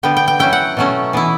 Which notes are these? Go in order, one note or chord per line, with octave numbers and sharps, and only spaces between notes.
D3 G3 B3 G5
G5
G5
F#3 C#4 E4 G5
F#5
B2 F#3 A3 C#4
E3 B3 E4